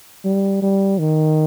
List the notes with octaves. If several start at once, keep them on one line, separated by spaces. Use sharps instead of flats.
G3
G3
D#3